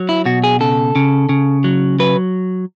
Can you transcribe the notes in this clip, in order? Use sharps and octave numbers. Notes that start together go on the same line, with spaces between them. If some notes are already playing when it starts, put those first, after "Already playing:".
Already playing: F#3
E4
B2 F#4
G#4
C#3 A4
C#3
C#3
F#3
F#3 B4